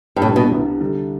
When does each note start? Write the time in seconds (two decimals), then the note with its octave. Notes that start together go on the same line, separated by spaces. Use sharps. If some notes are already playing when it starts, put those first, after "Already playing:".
0.16 G2
0.22 C2 A2 C3 G3 B3 D4
0.36 B2
0.51 C2 C3 G3 B3 D4
0.80 D3 G3 D4